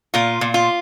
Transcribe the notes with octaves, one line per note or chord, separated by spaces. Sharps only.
A#2 F4
A#2
F4